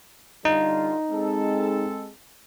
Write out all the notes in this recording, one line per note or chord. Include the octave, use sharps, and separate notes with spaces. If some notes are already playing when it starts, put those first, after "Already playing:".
D3 G3 D#4 F4
G#3 C4 A4